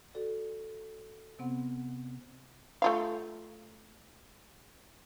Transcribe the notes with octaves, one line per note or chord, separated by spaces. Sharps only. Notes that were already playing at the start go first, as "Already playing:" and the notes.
F#4 A4 D5
C3 B3 C4 F#5
A3 F4 F5